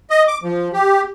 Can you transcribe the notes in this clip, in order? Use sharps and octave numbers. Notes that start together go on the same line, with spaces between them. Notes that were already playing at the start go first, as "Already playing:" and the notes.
D#5
D6
F3
G4